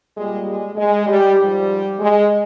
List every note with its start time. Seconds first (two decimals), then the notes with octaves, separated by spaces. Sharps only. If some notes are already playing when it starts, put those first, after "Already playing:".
0.15 A#2 G3 G#3
0.46 G#3
0.76 G#3
1.07 G3
1.37 G#2 F3 G3
1.99 G#3